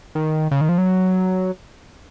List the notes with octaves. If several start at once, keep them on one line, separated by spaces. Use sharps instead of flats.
D#3
C#3
D#3
F3
F#3